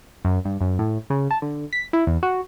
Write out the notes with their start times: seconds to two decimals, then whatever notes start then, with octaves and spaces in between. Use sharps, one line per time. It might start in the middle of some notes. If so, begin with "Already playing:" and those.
0.25 F#2
0.45 G2
0.61 F#2
0.79 A2
1.10 C#3
1.31 A5
1.42 D3
1.73 B6
1.93 E4
2.07 E2
2.23 F#4